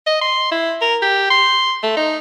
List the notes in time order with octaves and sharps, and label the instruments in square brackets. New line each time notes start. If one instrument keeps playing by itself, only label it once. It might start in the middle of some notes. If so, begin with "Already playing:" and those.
[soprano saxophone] D#5
C6
E4
A#4
G4
C6
A3
D#4